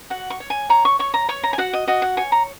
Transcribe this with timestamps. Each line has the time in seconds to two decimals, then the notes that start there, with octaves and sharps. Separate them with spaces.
0.10 F#4 F#5
0.30 C#6
0.40 C#5
0.50 G#5
0.69 C#5 A#5
0.85 C#6
0.99 C#5 C#6
1.14 A#5
1.29 C#5 C#6
1.43 A#5
1.53 G#5
1.58 F#4 F#5
1.73 D#5
1.87 F#4 D#5
2.02 F#5
2.17 C#5 G#5
2.32 A#5